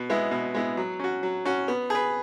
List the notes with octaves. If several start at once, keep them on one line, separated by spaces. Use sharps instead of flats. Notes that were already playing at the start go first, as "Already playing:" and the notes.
Already playing: B2
G#3 B3 E4
B2
G#3 B3 E4
F#3
C#4 F#4
F#3
C#4 F#4
B3
G#4 B4